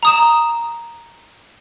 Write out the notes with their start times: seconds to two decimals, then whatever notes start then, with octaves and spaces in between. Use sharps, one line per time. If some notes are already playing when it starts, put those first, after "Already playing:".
0.03 A#5 D#6 E7